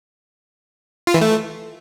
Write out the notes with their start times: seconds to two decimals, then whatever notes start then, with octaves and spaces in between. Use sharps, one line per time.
1.07 F4
1.14 E3
1.21 A3